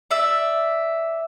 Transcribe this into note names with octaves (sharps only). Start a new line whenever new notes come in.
D5 E5